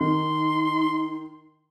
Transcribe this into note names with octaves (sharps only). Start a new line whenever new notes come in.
D#3 D#4 C6